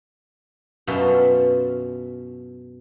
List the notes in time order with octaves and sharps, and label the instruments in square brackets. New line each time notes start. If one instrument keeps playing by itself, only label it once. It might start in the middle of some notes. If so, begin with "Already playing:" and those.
[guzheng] F#2 B2 F4 E5 A5